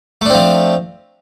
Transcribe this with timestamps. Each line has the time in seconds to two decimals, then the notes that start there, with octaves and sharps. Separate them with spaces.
0.21 A3
0.26 D4
0.30 C4
0.34 F3